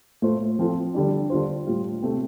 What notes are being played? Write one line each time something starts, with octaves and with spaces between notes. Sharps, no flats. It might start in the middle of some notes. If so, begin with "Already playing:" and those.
A2 A3 F4 C5
F3 C4 F4 A4
D3 G3 D4
D3 G3 F4 C5
A2 G3 F4
C3 A3 C4